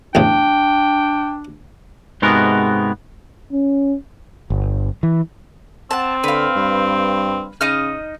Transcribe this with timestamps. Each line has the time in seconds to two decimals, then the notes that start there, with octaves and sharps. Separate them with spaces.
0.15 A1 E2 C#3 D4 G5
2.22 G#2 C3 G#3 B3 F#4 A#4
3.52 C#4
4.50 G1
5.03 E3
5.91 C4 F#5 A5
6.24 D3 B4 F5
6.56 G2
7.61 C#3 D#4 D#5 F6